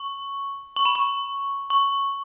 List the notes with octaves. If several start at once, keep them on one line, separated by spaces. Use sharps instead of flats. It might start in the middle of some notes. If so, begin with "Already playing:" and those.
Already playing: C#6
C#6
B5
C#6
C#6